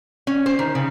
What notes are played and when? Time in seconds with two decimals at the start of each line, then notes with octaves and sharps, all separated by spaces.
0.27 C#4
0.46 C5
0.59 D#3
0.75 C#3